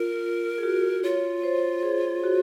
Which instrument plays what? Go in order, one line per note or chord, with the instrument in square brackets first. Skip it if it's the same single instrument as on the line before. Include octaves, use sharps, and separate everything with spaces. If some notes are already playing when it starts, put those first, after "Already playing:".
Already playing: [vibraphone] F4 [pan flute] A#4
[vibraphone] G#4
F#4
[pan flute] F4 [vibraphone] C#5
[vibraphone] C5
G#4
F#4